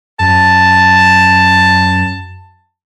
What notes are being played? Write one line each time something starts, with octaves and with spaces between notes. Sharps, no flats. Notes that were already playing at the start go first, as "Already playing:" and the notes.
F#2 A5